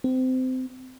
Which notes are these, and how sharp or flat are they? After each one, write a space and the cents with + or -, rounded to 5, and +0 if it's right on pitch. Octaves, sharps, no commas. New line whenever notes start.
C4 -25